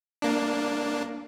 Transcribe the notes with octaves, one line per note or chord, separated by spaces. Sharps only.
A#3 D4